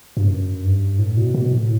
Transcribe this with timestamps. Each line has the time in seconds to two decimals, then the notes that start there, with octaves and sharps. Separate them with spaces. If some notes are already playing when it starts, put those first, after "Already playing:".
0.17 G2
0.30 F#2
0.65 G2
0.99 A2
1.17 B2
1.34 B2
1.52 A2